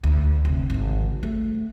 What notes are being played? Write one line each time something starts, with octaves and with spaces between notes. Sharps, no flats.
D2
F1
G#1 C#3
A3